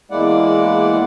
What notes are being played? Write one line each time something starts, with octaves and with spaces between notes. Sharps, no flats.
E2 G#3 A#3 E4 D5 F#5